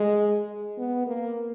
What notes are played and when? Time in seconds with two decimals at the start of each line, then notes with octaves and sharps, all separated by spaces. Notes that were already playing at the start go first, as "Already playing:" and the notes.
Already playing: G#3
0.78 B3
1.07 A#3